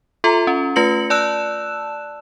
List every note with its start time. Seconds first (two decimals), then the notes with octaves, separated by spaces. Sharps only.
0.24 F4 A4 E5 A#5 C6
0.47 C#4
0.76 A3 F4 B4 A#6 C#7 F#7
1.10 D5 A5 E6 F#6 E7